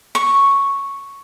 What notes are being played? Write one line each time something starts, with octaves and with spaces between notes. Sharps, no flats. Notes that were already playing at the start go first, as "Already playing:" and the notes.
C#6